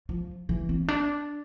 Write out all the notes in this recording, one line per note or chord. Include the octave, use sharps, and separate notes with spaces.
F3
E3
C4
D4